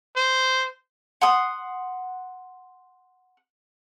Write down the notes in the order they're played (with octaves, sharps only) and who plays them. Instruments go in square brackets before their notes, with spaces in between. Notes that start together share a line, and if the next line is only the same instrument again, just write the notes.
[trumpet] C5
[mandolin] F#5 C6 D#6